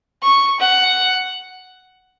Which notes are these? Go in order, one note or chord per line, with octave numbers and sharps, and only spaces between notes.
C#6
F#5